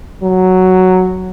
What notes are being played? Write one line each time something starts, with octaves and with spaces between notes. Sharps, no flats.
F#3